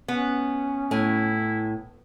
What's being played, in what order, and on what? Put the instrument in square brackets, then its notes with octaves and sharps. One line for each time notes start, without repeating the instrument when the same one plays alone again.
[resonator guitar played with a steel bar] B3 [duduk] C#4
[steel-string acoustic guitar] A2 G#5 [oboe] E4